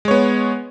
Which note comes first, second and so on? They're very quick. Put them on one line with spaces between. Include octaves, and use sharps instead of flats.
G#3 C#5 B3